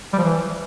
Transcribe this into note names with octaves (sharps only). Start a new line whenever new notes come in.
G3
F3
E3